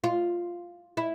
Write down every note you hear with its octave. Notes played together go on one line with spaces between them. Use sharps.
F4
E4